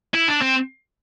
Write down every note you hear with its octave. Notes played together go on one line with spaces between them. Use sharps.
E4
D4
C4